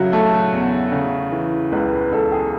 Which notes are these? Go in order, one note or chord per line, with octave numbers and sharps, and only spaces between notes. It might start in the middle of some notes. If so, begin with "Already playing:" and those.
Already playing: C#3 F#3 E4 F#4
A3 A4
E2
C#3
E3
C#2 B4
B4
C#2 A4
G#4